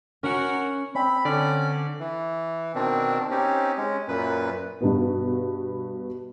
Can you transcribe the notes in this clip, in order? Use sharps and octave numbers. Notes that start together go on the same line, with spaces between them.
C#4 F#4 A#4
C4 B5
D3 C#4 D5
E3
B2 D#3 C4 D4
C4 C#4 D#4 G4
G#3 C#4
F#2 A#2 B4
G2 B2 B3